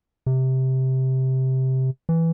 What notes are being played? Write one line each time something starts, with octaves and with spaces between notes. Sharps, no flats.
C3
E3